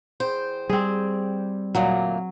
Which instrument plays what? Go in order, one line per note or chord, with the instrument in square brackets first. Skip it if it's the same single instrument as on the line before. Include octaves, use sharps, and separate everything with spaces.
[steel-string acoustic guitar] E2 C5 G5
[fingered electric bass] G3 [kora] C4 G#4
[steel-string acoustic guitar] D2 A#2 A#3 [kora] F#3